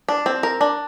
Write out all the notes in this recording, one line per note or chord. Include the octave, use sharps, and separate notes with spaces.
D4
C4
A#4
D4